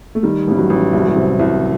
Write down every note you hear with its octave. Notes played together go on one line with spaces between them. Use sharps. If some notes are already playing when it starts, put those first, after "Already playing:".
A3
D#3 G3
A1 G3
F#3
A1
C2 G3
F#3
G3
C3
C2